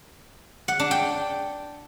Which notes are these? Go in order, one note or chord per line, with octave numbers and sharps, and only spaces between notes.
F#5
D4
G5